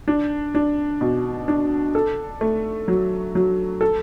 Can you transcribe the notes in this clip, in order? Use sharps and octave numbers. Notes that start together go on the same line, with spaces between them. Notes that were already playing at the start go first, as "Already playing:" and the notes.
D4
D4
B2
D4
A4
A3
F#3
F#3
A4